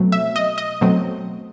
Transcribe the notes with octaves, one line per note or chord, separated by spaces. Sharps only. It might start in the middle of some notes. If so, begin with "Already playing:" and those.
Already playing: B2 F#3 A3 C4
E5
D#5
D#5
B2 F#3 A3 C4